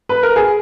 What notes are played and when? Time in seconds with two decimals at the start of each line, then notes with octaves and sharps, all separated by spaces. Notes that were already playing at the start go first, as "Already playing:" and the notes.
0.09 B4
0.23 A#4
0.36 G#4